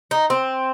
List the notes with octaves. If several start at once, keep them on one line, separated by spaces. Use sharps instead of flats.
D#4
C4